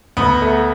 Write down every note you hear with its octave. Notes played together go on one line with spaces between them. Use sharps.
D2 B3
A3